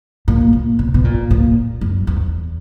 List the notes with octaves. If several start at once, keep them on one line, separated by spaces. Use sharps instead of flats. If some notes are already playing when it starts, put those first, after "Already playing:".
A#2
A#2
B2
B2
A#2
A#2
F#2
E2